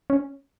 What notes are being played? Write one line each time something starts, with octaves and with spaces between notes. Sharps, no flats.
C#4